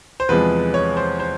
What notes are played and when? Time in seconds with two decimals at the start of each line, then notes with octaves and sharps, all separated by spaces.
0.20 C5
0.29 E2 C3 F3 G#3 B4
0.74 C#5
0.97 C5
1.20 C5